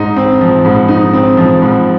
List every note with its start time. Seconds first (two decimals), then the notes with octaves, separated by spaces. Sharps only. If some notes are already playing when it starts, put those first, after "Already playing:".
Already playing: G#2 D#4
0.16 C4
0.41 F3
0.65 G#2
0.88 D#4
1.13 C4
1.37 F3
1.62 G#2